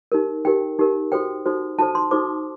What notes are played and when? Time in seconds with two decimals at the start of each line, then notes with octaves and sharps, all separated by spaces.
0.12 D#4 G4 A#4
0.45 D#4 G4 A#4 G5
0.79 D#4 G4 A#4
1.12 D#4 F#4 A4 C5 G5
1.46 D#4 F#4 A4 C5
1.79 D#4 F#4 A4 C5 A5
1.95 C6
2.11 D#4 F#4 A4 C5 D6